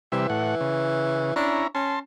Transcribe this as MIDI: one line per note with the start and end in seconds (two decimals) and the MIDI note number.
0.12 0.27 48
0.12 1.34 52
0.12 0.27 55
0.12 0.27 76
0.30 0.55 45
0.30 0.55 78
0.61 1.32 49
1.36 1.67 61
1.36 1.64 62
1.36 1.67 64
1.36 1.67 82
1.75 1.99 61
1.75 1.99 81
1.75 1.99 84